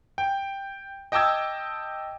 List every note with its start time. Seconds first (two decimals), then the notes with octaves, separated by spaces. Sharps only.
0.18 G5
1.12 D#5 G5 A5 D6 E6 G#6